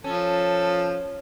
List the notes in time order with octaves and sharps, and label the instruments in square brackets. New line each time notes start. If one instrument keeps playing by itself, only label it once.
[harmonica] F3 A4 [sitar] C#4